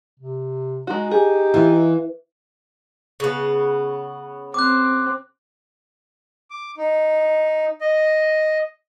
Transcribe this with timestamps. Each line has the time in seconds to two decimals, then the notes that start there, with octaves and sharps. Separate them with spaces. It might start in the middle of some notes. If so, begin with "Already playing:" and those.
0.19 C3
0.87 G#3 D#4 F#4
1.11 G4 G#4
1.54 E3 E4 F4
3.20 C#3 B3
4.54 C4 D6 F#6
6.51 D6
6.77 D#4
7.81 D#5